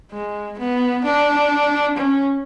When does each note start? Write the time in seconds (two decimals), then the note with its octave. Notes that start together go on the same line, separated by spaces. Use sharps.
0.12 G#3
0.59 B3
1.04 D4
1.97 C#4